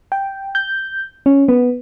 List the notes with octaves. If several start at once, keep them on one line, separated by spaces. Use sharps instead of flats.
G5
G6
C#4
B3